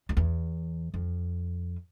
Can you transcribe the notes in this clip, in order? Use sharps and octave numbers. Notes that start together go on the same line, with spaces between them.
F2
E2
F2